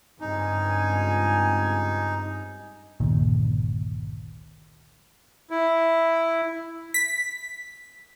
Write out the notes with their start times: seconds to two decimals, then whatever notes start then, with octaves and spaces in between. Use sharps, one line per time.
0.20 C#2 G2 C4 D#4 G#5
3.00 G1 C#2 A#2 D#3
5.50 E4
6.94 B6